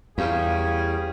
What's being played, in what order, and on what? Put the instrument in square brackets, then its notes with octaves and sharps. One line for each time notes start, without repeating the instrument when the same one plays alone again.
[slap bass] E2 [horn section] G3 C#4 G#4 [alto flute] F5